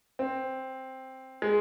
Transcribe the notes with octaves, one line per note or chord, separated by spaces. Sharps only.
C4
G#3